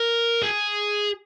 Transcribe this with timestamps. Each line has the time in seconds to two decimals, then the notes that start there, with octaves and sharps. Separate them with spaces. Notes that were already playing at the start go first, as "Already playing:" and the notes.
Already playing: A#4
0.42 G#4